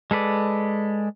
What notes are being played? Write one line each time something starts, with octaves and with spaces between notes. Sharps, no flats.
G#3 A4 B4 D5